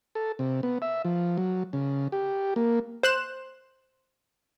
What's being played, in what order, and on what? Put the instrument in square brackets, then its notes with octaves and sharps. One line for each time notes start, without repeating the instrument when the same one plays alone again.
[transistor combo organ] A4
C3
B3
E5
F3
F#3
C#3
G4
A#3
[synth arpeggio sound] C5 F#6 E7